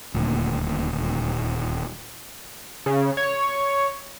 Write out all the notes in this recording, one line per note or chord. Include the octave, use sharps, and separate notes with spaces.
D#1 D2 A#2
C#3
C#5